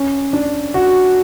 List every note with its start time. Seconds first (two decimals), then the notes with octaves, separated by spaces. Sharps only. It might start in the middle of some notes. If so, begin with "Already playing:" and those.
Already playing: C#4
0.33 D4
0.74 F#4